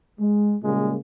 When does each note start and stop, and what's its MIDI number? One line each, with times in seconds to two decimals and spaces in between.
0.20 0.54 56
0.63 0.95 46
0.63 0.95 49
0.63 0.95 55
0.63 0.95 56
0.63 0.95 58